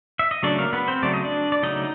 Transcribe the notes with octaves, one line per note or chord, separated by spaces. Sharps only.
E5
D#5
C#3 F#3 A3 D4 D5
A#3 A#4
B3 B4
C4 C5
C#3 F#3 A3 D5
D#5
D4 D5
D5
C#3 F#3 A3 D#4 D#5